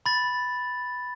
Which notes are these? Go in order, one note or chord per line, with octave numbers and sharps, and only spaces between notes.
B5 A6